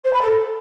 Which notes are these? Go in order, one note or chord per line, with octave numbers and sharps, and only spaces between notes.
C5
B5
A4